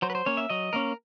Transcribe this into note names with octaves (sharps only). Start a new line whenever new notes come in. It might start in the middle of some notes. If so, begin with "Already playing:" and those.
F#3 C5
B4
C5
A#3 C#4 C#5
E5
F#3 D#5
A#3 C#4 A#4